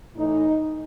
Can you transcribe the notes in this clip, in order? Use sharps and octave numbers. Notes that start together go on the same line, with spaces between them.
A2 E3 D#4